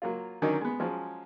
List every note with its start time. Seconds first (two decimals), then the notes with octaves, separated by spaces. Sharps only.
0.02 F#3 A#3 F4
0.42 D3 D#3 F#3 C#4 D#4
0.61 G#3 B3
0.80 F3 F#3 G#3 C#4